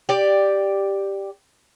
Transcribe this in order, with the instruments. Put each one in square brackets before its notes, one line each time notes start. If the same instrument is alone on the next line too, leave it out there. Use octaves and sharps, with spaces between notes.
[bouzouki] G4 D5